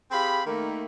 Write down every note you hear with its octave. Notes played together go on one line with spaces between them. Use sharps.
C4 G4 G#4 F5 B5
D#3 A3 A#3